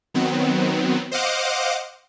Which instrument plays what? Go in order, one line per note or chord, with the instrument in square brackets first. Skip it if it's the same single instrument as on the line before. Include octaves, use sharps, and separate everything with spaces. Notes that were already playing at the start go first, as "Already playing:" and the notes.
[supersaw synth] D#3 F#3 B3 C4
C5 D#5 F5 F#5 D6